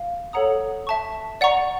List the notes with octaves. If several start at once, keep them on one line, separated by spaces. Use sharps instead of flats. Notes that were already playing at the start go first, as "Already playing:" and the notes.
Already playing: F5
A4 C#5 F#5 A#5 D#6
E5 A5 C#6
D5 F#5 A#5 C#6